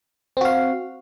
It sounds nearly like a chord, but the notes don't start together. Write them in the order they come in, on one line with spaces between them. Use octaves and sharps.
C4 F#4 F5